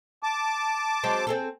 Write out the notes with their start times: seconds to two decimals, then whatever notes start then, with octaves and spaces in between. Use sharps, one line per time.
0.23 A5 D6
1.03 F#3 G#3 C4
1.27 C4 G#4 A4